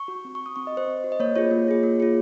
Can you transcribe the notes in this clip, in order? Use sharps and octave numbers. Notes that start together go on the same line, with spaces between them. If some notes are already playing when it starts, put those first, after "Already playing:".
Already playing: C#6
F#4
C4
C#6
F#4
D#6
C4 C#6
F#4 D#5
C5
C4
F#4
D#5
A#3 C#5
F4 G#4 C#5
A#3
F4 G#4
A#3
F4 G#4